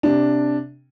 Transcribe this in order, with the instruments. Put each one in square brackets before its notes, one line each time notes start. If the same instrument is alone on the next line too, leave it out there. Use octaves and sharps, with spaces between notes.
[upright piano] C3 D4